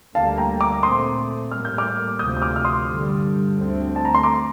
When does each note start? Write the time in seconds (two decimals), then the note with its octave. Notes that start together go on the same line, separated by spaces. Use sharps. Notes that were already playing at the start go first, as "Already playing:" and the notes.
0.14 D2 D3 G3 A#3 F5 A5
0.37 G5 A#5
0.60 A#5 D6
0.83 A#2 A3 C4 C6 D#6
1.51 A2 G3 A#3 F6
1.65 G6
1.78 D6 F6
2.19 D2 C3 F3 D#6 G6
2.37 D#6
2.42 D6 F6
2.56 F6
2.65 C6 D#6
2.88 G2 D3 G3
3.56 D2 D3 A3 C4
3.96 A5
4.05 A#5
4.15 C6
4.23 A#5 D6